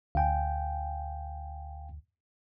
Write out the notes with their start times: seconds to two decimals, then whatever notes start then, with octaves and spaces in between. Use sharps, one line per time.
0.15 D2 F5 G5 G#5